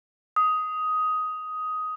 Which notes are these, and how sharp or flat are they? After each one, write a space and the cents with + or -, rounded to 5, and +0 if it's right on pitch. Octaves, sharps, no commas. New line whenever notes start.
D#6 +10